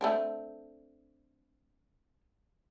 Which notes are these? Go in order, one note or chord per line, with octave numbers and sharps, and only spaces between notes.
A3 C4 D4